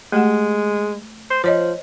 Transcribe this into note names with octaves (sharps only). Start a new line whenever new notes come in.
G#3 A3 G4 F#5
C5
F3 C5 C#5 D#5